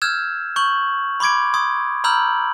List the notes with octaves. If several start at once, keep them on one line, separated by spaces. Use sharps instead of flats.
E6 F6 G6 G#6 E7
C#6 G6 F#7
B5 C6 D6 G#6 D7
C6 D#6 G#6
A#5 B5 E6 F6 G6 F#7